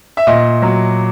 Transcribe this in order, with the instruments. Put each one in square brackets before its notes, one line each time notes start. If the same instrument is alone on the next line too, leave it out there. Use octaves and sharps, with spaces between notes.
[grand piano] E5
A#2 D#5
F#3